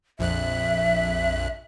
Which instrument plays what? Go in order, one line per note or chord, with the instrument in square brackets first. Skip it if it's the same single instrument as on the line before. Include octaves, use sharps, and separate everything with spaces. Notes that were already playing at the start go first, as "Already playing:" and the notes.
[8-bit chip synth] A#1 F2 F#6 [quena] E5